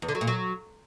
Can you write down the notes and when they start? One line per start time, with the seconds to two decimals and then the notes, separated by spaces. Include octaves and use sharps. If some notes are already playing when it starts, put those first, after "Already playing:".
0.02 E2
0.08 D3
0.15 F#3
0.21 A#2
0.27 F#3